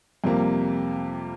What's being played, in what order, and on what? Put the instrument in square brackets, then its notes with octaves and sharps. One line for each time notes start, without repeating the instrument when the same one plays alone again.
[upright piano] F2 C3 G3 A#3